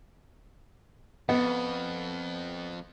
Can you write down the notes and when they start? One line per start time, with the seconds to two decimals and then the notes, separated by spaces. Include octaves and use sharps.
1.29 F2 B3